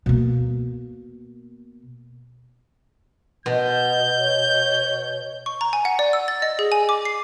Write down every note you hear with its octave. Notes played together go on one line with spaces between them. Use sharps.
B2 A#3
B2 G6
C#5
C#6
A#5
G#5
F#5
D5
E6
A6
D#5
G#4
G#5
D6
C7